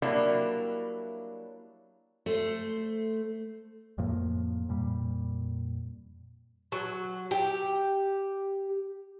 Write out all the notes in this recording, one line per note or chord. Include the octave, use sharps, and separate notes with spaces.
F#3 G3 A#3 D4 E4
A3 C5
F2 A2 F3 A#3
F2 A#2 G3
F#3
G4